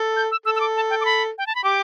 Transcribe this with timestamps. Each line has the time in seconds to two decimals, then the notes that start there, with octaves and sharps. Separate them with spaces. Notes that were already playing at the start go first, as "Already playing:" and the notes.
Already playing: A4
0.17 G6
0.31 E6
0.45 A4 E6
0.56 E6
0.60 D6
0.76 A5
0.90 G5
1.01 D6
1.05 B5
1.38 G5
1.47 A5
1.55 B5
1.64 G4 D6